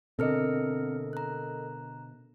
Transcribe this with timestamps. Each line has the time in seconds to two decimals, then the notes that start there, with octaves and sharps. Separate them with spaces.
0.19 B2 D3 C4 A4 A#4 D#5 F6 C#7
1.13 A#5 F#6